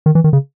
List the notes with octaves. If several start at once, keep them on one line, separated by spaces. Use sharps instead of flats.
D#3
E3
D#3
C#3